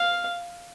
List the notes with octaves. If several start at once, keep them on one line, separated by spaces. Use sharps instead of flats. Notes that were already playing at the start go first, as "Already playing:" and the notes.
Already playing: F5